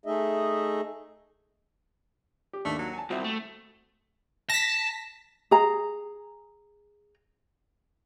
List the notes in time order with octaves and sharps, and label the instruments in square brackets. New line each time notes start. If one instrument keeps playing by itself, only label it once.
[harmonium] A3 D#4 G#4 D#5 E5
[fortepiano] G4
[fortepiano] D#2 A#3 D4 [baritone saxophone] A3
[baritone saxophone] F#3
[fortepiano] G#5 A5
[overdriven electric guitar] C2 [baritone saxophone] C4 [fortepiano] F#4 E5
[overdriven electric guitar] A3
[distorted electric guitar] A5 [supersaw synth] A#6 B6
[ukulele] G#4 A#5